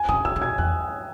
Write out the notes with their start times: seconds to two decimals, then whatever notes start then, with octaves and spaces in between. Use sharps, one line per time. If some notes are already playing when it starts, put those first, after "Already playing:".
Already playing: G#5
0.08 C#3 D#6
0.25 C#3 E6
0.36 C#3
0.42 B2 G#6
0.58 E2 F#6